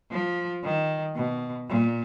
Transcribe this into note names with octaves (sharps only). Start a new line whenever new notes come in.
F3
D#3
B2
A#2